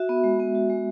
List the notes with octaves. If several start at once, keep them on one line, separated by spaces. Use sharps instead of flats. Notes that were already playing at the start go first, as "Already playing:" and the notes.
Already playing: F#4 E5
B3
G#3
B3
F#4
G#3